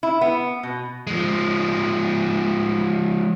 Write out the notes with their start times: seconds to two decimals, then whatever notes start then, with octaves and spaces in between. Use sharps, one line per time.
0.03 E4
0.21 B3
0.63 B2
1.07 F3 G#3